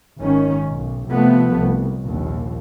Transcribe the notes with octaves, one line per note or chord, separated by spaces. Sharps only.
G#1 D#3 C#4
B1
C3 F3 A3 B3
C2
A#1 D#2